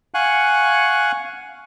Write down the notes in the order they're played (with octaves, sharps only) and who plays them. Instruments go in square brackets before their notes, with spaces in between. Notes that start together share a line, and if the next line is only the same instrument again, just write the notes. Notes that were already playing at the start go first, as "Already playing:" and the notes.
[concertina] F5 F#5 G#5 C#6 F#6